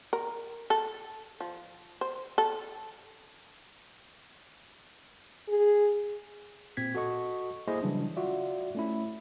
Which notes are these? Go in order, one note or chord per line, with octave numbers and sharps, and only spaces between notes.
A#4
A4
F3
C5
A4
G#4
A#2 C4 G#6 B6
F#4 A4 D#5 C#6
A#3 E4 G#4 C5 D#5
C#3 E3 F#3 G3 D4
F4 F#4 D5 E5
A3 C#4 E4